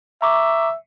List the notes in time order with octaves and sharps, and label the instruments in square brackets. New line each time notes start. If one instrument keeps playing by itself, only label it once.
[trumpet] E5 [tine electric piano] A#5 C#6 D6